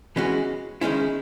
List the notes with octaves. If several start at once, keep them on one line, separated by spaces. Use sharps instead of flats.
E3 G#3 C#4 F#4
D#3 G#3 C#4 E4